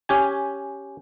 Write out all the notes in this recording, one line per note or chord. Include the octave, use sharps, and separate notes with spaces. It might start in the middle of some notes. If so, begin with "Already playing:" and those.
C#4 G4 G#5